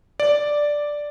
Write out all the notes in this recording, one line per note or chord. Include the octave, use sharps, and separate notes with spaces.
D5